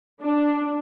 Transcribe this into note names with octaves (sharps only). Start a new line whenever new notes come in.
D4